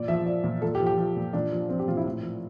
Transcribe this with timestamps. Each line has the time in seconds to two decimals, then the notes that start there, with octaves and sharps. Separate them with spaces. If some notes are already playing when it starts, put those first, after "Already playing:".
Already playing: A#2 D5
0.08 F3 E5
0.26 F3 D5
0.44 A#2
0.62 A#2 A4
0.75 G4
0.80 F3
0.87 G4
0.98 F3
1.17 A#2
1.33 A#2 D4
1.52 F3
1.69 F3 C4
1.79 G4
1.88 A#2 F4
1.97 E4
2.05 A2
2.23 F3